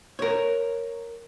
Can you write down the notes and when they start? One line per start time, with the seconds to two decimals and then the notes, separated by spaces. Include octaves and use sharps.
0.19 A#4 C#5